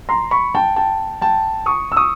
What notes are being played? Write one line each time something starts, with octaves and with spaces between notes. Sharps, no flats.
A#5 C6
B5 C#6
G5 A5
G5 A5
G5 A5
C#6 D#6
E6
C#6 D#6